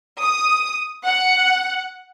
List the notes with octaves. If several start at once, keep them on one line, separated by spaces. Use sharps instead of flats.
D#6
F#5